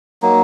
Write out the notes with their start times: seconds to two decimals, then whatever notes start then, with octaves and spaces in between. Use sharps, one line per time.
0.22 F#3 A#3 D#4